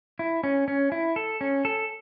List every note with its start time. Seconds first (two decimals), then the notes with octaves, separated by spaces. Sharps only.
0.19 E4
0.44 C#4
0.68 C#4
0.92 E4
1.16 A4
1.41 C#4
1.65 A4